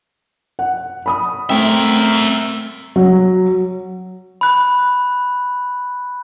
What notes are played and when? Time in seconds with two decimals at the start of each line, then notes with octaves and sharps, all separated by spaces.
0.59 F#5
1.06 B5 D#6
1.50 A3 C4 A#4 E5 G5
2.96 F#3
4.41 B5 F#6